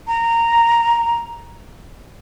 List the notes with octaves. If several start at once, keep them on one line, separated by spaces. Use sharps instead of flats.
A#5